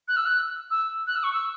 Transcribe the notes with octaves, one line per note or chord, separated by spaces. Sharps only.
F#6
E6
F#6
E6
F#6
E6
C#6
E6